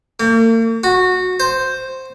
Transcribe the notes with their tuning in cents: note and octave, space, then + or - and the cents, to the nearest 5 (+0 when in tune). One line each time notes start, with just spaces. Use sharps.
A#3 -45
F#4 -15
C5 +0